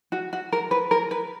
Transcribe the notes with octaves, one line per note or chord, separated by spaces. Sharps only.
F#4
F#4
A#4
B4
A#4
B4